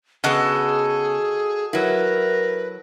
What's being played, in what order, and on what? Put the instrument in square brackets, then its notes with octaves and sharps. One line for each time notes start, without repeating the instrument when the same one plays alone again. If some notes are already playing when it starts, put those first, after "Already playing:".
[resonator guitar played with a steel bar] C#3 B3 [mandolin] F#4 A4 D#5 [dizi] G#4
[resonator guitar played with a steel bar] F#3 E4 [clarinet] A#4 [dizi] B4